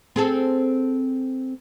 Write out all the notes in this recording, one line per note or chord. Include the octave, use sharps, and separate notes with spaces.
C4 G#4 A4